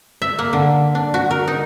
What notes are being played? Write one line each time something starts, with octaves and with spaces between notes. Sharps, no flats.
E5
A#3
D3
D4
F#4
A#4
D#4